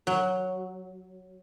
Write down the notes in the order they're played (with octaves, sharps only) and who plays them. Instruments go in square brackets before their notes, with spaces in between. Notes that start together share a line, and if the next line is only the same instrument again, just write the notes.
[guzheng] F#3